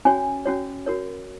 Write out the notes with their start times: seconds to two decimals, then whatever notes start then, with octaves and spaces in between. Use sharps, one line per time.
0.05 C#4 F#4 C#5 G#5
0.46 C#4 F#4 C#5
0.86 F#4 A#4 C#5